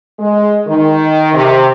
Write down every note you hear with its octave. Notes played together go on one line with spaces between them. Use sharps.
G#3
D#3
C3